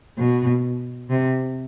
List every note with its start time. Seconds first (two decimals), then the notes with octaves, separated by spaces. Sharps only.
0.18 B2
1.10 C3